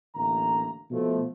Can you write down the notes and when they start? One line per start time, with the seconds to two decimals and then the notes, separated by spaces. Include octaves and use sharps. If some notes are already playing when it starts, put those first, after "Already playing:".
0.16 A1 D3 A3 A#3 A#5
0.91 B2 F3 A3